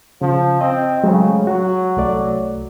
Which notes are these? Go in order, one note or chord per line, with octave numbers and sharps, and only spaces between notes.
C#3 F3
C4 D#5
C#3 F#3 G#3 A3
F#3 F#4
C2 A3 D5